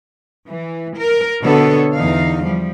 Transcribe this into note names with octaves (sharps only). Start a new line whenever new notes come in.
E3
A#4
B2 D3 B3 A4 C#5
E2 E3 D#4 F5
F3 G3